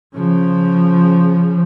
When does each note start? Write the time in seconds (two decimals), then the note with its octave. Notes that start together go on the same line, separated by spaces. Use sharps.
0.15 C#3 F3